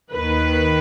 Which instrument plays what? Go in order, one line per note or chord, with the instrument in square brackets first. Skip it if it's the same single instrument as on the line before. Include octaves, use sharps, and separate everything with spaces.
[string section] D#2 D#3 B4